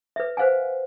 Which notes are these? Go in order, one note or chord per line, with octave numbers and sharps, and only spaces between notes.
B4 E5
B4 C5 F5 F#5 G#5